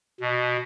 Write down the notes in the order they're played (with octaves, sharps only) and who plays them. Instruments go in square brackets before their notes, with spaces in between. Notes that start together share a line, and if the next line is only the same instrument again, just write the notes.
[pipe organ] B2